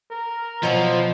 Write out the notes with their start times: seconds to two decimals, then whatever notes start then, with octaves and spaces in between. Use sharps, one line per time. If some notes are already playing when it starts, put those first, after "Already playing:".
0.11 A#4
0.63 B2 F3 F#3 C5